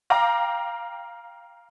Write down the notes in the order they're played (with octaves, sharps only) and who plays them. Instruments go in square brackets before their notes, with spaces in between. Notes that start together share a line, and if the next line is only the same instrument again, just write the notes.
[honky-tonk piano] F5 G5 A#5 D6